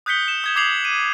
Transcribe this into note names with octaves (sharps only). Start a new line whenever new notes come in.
D#6 F#6 G6 B6 C#7 G7
E7
D#6 G#6 E7
D6 D#6 G#6 C7 F7 F#7
D#7